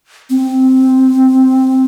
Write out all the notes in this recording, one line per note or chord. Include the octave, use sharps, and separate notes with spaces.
C4